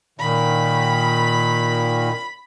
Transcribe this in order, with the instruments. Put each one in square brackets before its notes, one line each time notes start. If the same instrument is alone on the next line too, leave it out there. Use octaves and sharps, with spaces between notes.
[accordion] A#2 D#3 [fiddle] B5